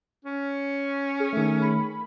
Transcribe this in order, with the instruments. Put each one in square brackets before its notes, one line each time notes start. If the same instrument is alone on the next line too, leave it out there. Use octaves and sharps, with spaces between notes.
[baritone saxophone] C#4
[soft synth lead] G#4
[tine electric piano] D#3 A3
[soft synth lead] B5